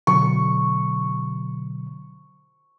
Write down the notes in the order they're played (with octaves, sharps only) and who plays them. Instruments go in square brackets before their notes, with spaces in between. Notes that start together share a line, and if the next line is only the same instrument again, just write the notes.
[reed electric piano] B2 D3 F#3 [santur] C#6